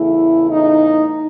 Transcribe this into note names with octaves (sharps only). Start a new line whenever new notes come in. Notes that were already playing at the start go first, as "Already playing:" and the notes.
Already playing: E2 C#3 E3 A3 E4
D#4